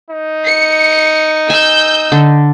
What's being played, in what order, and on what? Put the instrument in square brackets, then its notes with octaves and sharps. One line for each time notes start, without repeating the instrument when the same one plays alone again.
[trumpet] D#4
[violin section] C#7
[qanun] G#5 [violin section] E6 G6
[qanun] D3